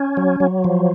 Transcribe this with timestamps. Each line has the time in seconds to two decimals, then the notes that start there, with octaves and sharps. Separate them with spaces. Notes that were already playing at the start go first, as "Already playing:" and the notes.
Already playing: C#4
0.17 F#3
0.40 F#3
0.64 F3